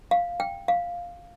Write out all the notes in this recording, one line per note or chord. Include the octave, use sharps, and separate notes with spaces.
F5
G5
F5